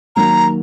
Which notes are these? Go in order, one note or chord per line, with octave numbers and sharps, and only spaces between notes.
D#3 F#3 A#3 A#5